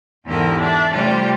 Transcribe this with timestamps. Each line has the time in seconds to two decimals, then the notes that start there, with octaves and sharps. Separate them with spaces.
0.25 E2 G#2 D3 E4 G4 A#4
0.59 D4 D5 E5
0.91 C3 G3 A3 C#4 F4 G4